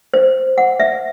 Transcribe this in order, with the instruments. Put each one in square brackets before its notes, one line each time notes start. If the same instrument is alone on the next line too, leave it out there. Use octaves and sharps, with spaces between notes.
[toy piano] C5
F#5
E5